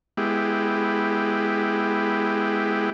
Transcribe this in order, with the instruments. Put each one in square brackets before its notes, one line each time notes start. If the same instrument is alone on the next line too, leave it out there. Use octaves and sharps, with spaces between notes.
[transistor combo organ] G#3 B3 E4 G4